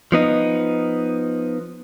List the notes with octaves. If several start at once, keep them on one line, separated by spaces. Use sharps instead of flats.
F3 B3 D#4